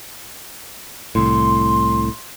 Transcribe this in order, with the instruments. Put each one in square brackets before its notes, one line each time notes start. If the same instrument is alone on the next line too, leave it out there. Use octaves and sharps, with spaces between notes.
[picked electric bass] C2 A2 [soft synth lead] C6